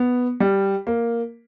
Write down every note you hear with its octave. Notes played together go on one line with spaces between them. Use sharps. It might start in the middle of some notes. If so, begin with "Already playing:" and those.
Already playing: B3
G3
A#3